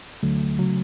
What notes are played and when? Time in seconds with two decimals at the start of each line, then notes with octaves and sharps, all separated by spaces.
0.23 D2 D3 F#3 A3
0.59 C#3 F#3